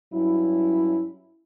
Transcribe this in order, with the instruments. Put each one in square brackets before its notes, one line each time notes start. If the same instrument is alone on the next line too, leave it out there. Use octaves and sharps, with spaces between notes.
[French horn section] G2 F#3 C#4 E4